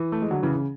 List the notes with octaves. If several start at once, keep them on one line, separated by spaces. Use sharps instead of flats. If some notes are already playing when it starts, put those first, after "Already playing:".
Already playing: E3
A3
G#3
D3 F#3
C#3 E3
C#3